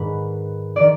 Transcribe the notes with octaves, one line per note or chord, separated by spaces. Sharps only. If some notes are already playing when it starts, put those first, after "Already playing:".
Already playing: G#2 D#3 B4
D#3 D5